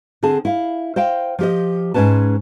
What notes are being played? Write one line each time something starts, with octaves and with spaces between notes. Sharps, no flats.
D3 C4 G#4 A5
E4 F5
C5 D#5 F5 G5
F3 G4 D#5
G#2 G#3 C#4 B4 A5